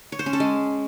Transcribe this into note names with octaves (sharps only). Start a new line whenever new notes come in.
C#5
C5
C#4
A4
G#3